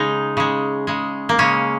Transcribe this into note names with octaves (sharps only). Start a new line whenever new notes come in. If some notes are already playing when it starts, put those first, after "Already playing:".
Already playing: C#3 G#3 D#4
C#3 G#3
C#3 G#3
A#3
C#3 G#3 C#4